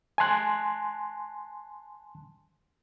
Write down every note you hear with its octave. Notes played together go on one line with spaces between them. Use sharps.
G#5 A5 C6 F#6